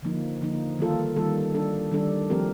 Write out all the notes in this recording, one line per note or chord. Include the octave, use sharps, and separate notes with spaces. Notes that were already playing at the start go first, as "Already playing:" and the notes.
D3 F3 A#3 D#4
D3 F3 A#3 D#4
D#3 G3 A#3 F4 A4
D#3 G3 A#3 F4 A4
D#3 G3 D4 A4
D#3 G3 D4 A4
F3 A3 C4 G4 A#4